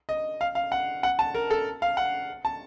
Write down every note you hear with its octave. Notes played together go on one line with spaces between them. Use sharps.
D#5
F5
F5
F#5
F#5
A5
A#4
A4
F5
F#5
A5